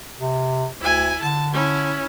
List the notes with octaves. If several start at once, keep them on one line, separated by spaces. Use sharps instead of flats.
C3
D2 E4 G#5
D3 A5
C#4 E4